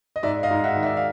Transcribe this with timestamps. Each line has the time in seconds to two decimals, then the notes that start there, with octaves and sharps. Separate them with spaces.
0.16 D#5
0.23 G#2 D5 E5
0.43 D#5 F5
0.51 G#2
0.64 E5 F#5
0.76 D#3
0.83 D5 E5
0.97 F5